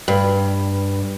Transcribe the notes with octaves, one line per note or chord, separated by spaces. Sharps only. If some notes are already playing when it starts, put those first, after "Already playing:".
G2